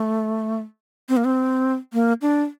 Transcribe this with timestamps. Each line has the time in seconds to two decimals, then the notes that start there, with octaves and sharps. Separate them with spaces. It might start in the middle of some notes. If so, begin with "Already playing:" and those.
Already playing: A3
1.09 C4
1.17 A#3
1.25 C4
1.93 A#3
2.22 D4